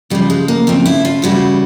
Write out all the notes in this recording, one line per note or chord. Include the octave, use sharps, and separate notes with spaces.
C#3 F3 G3
G#3
A#3
C#3 F3 C4
E4
F4
C#3 E3 G3 F#4